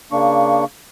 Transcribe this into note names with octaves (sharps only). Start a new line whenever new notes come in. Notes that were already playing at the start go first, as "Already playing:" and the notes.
C#3 A#3 D4 C#6